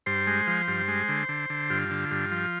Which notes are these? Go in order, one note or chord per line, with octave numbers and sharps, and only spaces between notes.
G2 C5
G#3
F3
G2
G#3
D3
D3
D3
G2 F4
D3
G2
F3